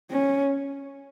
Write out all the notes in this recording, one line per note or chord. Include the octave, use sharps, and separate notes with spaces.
C#4